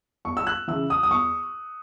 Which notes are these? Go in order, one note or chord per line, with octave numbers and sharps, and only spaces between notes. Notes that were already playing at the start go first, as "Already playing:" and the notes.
E2 C#6
E6
F#6
C#3 E3 E6
D#6
D#6
E2 C#6